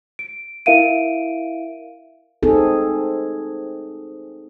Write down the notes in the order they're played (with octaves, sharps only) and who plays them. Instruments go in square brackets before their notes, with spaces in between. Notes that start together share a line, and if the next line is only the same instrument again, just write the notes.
[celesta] D7
E4 A#4 E5 F5 D7 D#7
[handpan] C4 D#4 G#4 A4